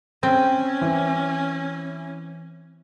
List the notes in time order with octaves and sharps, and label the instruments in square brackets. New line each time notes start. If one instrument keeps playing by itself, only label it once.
[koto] C4 [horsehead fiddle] C#4
[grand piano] E3